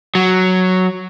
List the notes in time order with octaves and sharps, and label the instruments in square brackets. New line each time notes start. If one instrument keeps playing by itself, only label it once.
[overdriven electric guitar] F#3